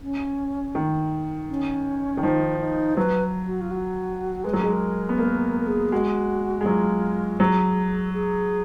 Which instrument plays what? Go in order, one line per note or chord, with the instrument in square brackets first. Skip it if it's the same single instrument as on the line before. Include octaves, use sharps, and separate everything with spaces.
[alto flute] C#4
[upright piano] D#3
[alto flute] C#4
[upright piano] D#3
[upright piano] F3 [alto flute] D#4
[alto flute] D#4
[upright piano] F#3 [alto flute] B4
[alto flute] F#4
F4
F#4
[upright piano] G#3 [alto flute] B4
[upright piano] F#3 [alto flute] A#4
[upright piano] G#3 [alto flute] G#4
[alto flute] A#4
[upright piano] B3
[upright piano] A#3 [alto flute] A#4
[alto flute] A#4
A#4
G#4
[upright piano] G#3 [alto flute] F#4
[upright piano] G#3
[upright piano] F#3 [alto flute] F4
[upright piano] F#3 [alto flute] G#4
[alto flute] G#4